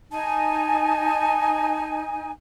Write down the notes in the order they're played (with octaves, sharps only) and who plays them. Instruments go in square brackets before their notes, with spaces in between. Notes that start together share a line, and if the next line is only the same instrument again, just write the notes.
[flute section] D#4 G#5 [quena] A5